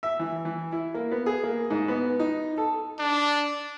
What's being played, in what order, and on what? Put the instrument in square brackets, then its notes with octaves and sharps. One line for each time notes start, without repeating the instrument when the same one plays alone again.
[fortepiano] E5
E3
E3
E4
A#3
B3
G#4
A#3
G#2
B3
D#4
A4
[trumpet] D4